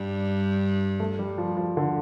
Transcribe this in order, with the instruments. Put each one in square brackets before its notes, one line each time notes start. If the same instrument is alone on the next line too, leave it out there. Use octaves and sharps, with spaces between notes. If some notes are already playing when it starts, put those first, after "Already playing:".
Already playing: [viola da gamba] G2 [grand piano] G3
[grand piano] A3
G3
F3
F3
D3